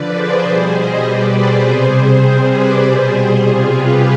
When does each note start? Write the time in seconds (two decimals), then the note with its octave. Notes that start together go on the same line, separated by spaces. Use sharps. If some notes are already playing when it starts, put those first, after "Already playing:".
Already playing: D3 F3 B4 D5
0.12 G#4 C5
0.42 B2 G3 G#4 C5
0.72 C5 D#5
1.02 B2 G3 B4 D5
1.33 G#4 C5
1.63 C3 G3
2.22 C3 G3 G#4 C5
2.53 B4 D5
2.83 B2 G3 G#4 C5
3.43 C3 G3 F4 G#4
3.72 G4 B4